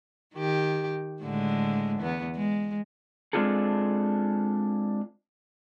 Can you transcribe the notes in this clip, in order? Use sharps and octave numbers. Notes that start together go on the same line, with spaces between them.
D#3 G4
A2 D3 G#3
E2 B3
G#3
G#3 C4 D4 F4 G#4 A4